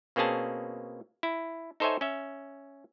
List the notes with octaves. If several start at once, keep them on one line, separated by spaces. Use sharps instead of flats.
B2 A#3 C4 C#4 G#4 A5
E4
D#4 A4 C5 C#5 E5 G#5
C#4 E5